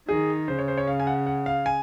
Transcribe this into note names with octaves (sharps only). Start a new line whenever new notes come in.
D#3 G#4
C#3 C5
C#5
C5
C#5
F5
G#5
F#5
F#5
F5
G#5